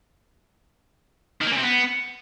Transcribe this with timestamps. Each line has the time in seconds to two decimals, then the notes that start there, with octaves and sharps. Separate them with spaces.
1.41 D#3
1.46 A#3
1.52 C#3
1.57 C3
1.62 B3